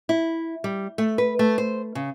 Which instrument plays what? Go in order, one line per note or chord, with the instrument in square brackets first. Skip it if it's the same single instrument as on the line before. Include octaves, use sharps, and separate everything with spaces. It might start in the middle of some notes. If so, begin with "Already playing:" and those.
[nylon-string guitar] E4
G3
A3
B4
A3
C5
C#3